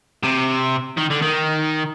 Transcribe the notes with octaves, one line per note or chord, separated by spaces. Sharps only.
C3
D#3
D3
D#3